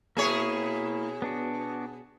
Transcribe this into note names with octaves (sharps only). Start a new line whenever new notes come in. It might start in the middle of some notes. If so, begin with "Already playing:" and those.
B2 A#3 E4 G#4 C#5
B3 D4 F#4